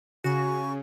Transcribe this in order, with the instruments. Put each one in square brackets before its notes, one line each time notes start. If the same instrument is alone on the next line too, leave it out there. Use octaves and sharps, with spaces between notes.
[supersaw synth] C#3 [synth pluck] F#4 [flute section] G#5 C#6